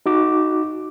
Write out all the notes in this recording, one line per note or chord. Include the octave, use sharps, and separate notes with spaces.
D#4 F#4 D6